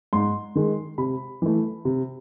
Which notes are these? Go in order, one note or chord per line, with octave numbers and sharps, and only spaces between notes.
G#2 C6
D#3 G#3
C3 B5
E3 A3
C3